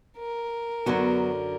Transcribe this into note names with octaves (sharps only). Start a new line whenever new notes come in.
A#4
F#2 D3 F#3 B3 F#4